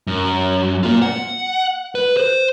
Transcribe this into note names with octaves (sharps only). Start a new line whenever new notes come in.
F#2
A#3 F4
F#5
B4
C5